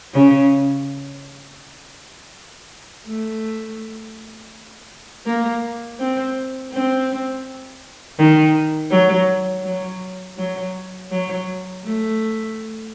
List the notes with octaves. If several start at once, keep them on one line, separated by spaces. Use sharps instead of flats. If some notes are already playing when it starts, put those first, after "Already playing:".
C#3
A3
A#3
C4
C4
D#3
F#3
F#3
F#3
F#3
A3